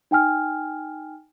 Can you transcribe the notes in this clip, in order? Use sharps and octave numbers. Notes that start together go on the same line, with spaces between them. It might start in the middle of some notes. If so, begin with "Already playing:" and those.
D#4 G5 G#5 F6